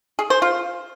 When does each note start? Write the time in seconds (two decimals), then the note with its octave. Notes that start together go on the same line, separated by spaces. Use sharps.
0.19 G#4
0.30 C5
0.42 F4